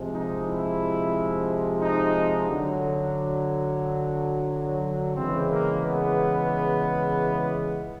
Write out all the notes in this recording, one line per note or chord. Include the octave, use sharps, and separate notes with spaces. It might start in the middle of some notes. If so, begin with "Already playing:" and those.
Already playing: C3 F3 G#3
D#4
E4
D#4
D3 F#3
C#3 E3 G#3 C4
A#3
B3